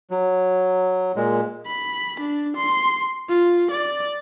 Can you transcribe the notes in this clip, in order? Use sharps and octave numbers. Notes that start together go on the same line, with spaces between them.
F#3
A#2 G#3
B5
D4
C6
F4
D5